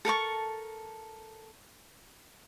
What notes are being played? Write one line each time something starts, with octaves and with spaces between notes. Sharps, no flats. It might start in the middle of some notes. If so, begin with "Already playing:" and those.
A4 A#4 A5 C#6